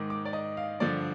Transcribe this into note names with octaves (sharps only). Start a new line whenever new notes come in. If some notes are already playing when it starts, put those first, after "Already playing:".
Already playing: G#2 D#3 D6
D6
D5
D#5
F5
G2 D3 F3 D5